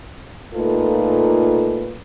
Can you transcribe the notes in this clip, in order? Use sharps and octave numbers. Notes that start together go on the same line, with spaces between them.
A#2 A3 D#4 F4 A4 B4